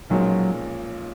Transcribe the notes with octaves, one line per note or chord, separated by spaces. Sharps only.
B1 A#2 F3 F#3 G#3 C#4